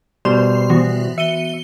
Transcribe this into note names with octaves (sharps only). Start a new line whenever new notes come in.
B2 G3 C5 C6 F7
E3 B3 F#4
E5 C#7 D#7 G7